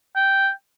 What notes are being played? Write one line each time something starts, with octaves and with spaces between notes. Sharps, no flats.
G5